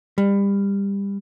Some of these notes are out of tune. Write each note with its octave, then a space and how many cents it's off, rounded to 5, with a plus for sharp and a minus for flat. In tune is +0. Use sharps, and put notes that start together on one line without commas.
G3 +25